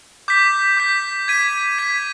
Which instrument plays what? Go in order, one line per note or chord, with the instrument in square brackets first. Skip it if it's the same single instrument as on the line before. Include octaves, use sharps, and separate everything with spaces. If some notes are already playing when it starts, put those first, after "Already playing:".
[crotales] D6 G6 B6
D6 G6 B6
G#6 B6 D#7
G#6 B6 D#7